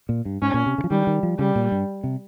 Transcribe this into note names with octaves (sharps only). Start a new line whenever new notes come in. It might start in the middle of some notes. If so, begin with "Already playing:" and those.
A#2
G2
G#2 C#4
A#2
C3
C#3
F3
D#3 G3
D#3
F3
C#3 G3
A#2
G2
C3